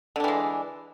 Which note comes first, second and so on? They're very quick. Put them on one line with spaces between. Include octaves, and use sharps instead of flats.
D3 D4 E3 G#3